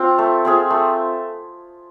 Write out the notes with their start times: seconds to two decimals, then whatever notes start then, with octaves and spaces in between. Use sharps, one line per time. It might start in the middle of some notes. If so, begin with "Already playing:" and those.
Already playing: C4 F4
0.19 A3
0.45 C4 F4 G#4
0.70 A3